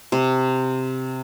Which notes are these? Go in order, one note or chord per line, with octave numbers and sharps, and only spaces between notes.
C3